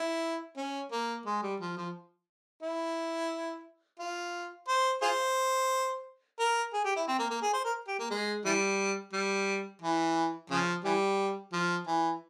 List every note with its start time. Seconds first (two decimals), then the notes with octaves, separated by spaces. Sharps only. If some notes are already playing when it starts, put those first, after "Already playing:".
Already playing: E4
0.57 C#4
0.92 A#3
1.26 G#3
1.43 G3
1.60 F3
1.77 F3
2.63 E4
4.00 F4
4.68 C5
5.02 F4 G#4 C5
6.39 A#4
6.73 G#4
6.85 G4
6.96 E4
7.08 C4
7.19 A#3
7.31 A#3
7.42 G#4
7.53 C5
7.65 A#4
7.88 G4
7.99 A#3
8.11 G#3
8.45 E3 G3
9.13 G3
9.82 E3
10.50 C#3 F3
10.84 E3 G3
11.53 F3
11.87 E3